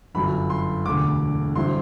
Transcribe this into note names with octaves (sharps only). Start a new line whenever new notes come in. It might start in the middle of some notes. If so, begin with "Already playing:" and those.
G1 F#2 F#3 B5
C6
E1 D2 D3 D6
G2 D3 F#3 C4 E4 C6